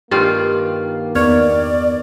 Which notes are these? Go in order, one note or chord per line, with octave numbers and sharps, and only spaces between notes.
G2 D#3 G3 A#3 F4
E2 B3 C#5 D5 F6